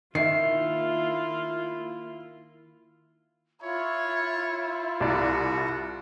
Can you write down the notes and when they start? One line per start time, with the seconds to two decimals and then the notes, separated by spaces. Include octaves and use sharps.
0.15 D#3 A#3 E4 F4 E5 C7
3.63 E4 F4 C#5
5.00 C2 F#4 D5